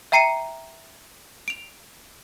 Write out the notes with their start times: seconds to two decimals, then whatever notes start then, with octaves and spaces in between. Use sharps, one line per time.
0.12 E5 G5 A#5 C7 C#7 D#7
1.48 D7 F7